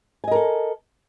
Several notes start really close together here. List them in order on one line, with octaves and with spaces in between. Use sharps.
G#5 D#5 A#4 A4